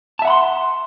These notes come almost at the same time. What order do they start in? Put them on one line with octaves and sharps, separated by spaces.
A5 E5 F#5 B5 C6